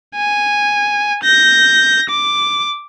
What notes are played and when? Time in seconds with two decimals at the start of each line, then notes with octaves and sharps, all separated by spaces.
0.15 G#5
1.23 G6 A#6
2.10 D6